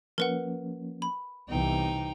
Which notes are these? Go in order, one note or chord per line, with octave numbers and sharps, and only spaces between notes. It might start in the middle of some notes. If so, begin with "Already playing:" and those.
F3 A#3 C#4 A#4 B4 F#5
B5
C2 C3 E3 B3 D#4 G5